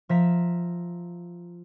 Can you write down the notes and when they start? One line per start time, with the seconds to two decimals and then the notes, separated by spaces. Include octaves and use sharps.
0.09 F3 E5 A#5 B6 E7